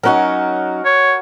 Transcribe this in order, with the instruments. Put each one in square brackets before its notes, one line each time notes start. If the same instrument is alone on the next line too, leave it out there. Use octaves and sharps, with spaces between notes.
[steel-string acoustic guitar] F#3 C#4 D#4 [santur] F#4 A#4
[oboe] C#5